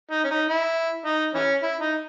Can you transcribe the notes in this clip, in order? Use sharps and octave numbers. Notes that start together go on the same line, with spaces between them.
D#4
C#4
D#4
E4
D#4
E3 C#4
E4
D#4